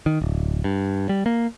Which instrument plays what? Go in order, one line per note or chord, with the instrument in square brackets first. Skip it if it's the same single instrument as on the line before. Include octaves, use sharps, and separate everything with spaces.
[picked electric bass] D#3
D1
G2
G3
A#3